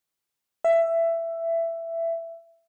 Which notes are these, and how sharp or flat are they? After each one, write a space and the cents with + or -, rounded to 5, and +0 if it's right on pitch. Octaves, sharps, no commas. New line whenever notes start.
E5 +15